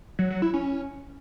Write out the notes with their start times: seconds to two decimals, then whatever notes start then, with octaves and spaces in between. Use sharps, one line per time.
0.19 F#3
0.30 F#3
0.42 E4
0.54 C#4